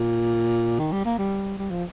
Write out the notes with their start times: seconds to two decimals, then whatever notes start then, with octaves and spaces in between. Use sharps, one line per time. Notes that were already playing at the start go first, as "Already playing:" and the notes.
Already playing: A#2
0.79 D#3
0.92 G3
1.05 A#3
1.18 G3
1.58 G3
1.70 F3